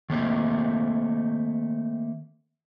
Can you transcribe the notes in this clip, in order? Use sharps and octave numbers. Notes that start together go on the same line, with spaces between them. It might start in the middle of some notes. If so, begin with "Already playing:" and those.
D#3 A3 A#3 C4